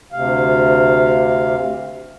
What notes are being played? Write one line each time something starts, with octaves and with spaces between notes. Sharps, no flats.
D2 C3 F5